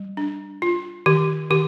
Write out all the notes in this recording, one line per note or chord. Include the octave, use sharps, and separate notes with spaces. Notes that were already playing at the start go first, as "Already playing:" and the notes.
Already playing: G3
D4
F4
D#3 G4
D#3 G4